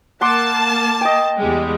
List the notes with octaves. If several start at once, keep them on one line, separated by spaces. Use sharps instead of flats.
A#3 F#5 A5 C6 D6
D#5 G5
E2 G3 G#3